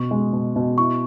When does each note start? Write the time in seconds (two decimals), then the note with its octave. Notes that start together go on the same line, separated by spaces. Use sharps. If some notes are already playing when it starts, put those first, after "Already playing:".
Already playing: B2 C#6
0.11 G#3
0.33 B2
0.56 B2
0.78 E4 C#6